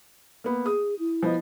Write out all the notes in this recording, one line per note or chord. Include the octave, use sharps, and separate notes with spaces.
A#3 B3
G#4 D#6
E4
F3 B3 D#5